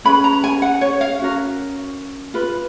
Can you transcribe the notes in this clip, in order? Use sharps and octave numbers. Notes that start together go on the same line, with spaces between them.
C#4 G#4 B4 B5
A#5
G#5
F#5
C#5
F5
C#4 F#4 A#4
F4 B4